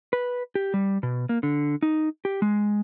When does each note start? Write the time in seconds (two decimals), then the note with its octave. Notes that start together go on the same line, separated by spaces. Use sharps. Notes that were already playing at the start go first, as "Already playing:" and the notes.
0.13 B4
0.55 G4
0.74 G3
1.03 B2
1.29 A#3
1.43 D3
1.82 D#4
2.25 G4
2.42 G#3